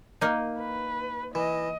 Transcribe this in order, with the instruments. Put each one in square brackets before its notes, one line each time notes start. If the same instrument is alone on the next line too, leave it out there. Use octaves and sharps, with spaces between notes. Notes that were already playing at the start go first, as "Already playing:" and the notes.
[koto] A#3 D#4
[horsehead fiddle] B4
[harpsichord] E3 [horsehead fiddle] D#5